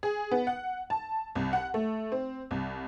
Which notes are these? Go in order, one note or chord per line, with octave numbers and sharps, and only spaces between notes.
G#4
B3
F#5
A5
C2
F#5
A3
C4
C2